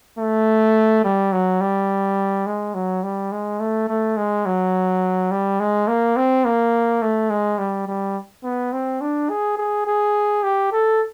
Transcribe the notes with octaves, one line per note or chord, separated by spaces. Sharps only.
A3
G3
F#3
G3
G#3
F#3
G3
G#3
A3
A3
G#3
F#3
G3
G#3
A#3
C4
A#3
A3
G#3
G3
G3
B3
C4
D4
G#4
G#4
G#4
G4
A4